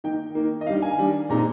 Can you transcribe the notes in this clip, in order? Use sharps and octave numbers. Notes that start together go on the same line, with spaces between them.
D#3 A#3 D#4 G5
D#3 A#3 D#4
D#5
D#3 G3 D4 F5
G#5
D#3 G3 D4
A#2 G#3 C4 D#4 A#5